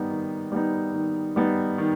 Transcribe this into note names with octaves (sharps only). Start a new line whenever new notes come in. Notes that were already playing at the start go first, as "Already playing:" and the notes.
Already playing: D#3 G3 B3 D#4
D#3
G3 B3 D#4
D#3
G3 B3 D#4
D#3